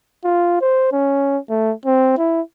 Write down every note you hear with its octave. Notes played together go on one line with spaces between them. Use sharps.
F4
C5
C#4
A3
C4
E4